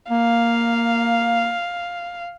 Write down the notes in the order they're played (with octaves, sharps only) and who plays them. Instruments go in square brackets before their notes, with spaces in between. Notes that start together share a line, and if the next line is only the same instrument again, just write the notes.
[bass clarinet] A#3 [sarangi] F5